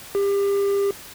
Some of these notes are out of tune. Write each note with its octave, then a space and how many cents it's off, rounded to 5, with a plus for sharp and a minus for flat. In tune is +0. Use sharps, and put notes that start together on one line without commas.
G4 +30